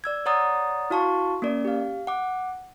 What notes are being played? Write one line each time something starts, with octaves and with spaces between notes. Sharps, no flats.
D5 E6 G#6
C#5 D5 F#5 A#5 D#6 A6
E4 F#4 F5 A5 C6 C#6
A#3 C#4 A#4 D5
G4 F5
F#5 D6